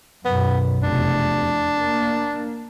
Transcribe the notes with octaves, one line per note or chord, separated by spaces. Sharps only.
B1 F#2 B3
F1 E2 D4
A#3